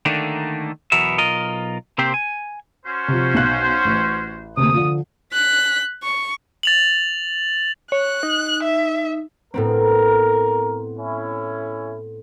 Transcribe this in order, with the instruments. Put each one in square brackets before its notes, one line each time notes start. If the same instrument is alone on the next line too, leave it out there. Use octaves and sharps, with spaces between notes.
[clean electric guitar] D3 D#3 A3 A#3 D4
B1 E2 B2 B3 A#4 E5
B1 F4 A#4 D#5
C3 A#3 C4 G4 C5
G#5
[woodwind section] C#4 F#4 C5
[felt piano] C3 F3
B1 F#6
A1
[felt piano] F#1 D2 C3 [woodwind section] D#6
[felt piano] D3 F3
[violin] F#6 B6
C#6
[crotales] A6 F7 F#7
[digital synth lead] C#5 [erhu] F#6
[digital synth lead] D#4
[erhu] E5
[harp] A2 B3 C4 [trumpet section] A#4
[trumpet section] C#4 E4